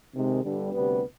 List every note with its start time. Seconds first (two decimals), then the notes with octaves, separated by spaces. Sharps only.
0.14 C3 D#3 G#3
0.44 G1 G2 D3 G3
0.73 D2 C3 G3 B3